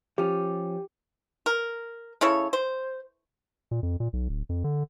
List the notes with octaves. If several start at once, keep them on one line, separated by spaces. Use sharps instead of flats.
F3 C#4 G4
A#4
C#3 E4 A4 C#5
C5
A#2
F2
A#2
B1
D1
F2
D3